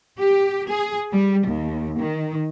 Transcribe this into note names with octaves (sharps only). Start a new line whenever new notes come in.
G4
G#4
G3
D#2
D#3